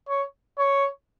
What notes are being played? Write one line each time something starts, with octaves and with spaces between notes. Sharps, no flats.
C#5
C#5